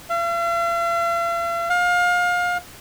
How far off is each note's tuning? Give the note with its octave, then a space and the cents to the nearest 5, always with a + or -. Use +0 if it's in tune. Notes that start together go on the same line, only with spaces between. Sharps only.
F5 -45
F5 +30